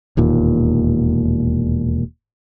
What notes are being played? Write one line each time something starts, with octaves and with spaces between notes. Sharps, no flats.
E1 D#2 A#2